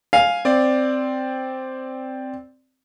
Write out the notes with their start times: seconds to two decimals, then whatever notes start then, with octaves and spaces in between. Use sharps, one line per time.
0.13 F5 G#5
0.45 C4 D5